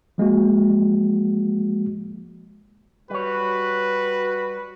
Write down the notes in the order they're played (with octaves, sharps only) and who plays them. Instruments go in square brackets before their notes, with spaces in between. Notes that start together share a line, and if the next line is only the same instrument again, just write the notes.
[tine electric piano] F3 G#3 A#3 F#4
[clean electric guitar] G3 C#5 [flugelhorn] F#4 [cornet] B4